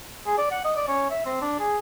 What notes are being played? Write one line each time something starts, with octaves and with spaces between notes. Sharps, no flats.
G#4
D5
F#5
D#5
D5
C#4
E5
C4
D4
G#4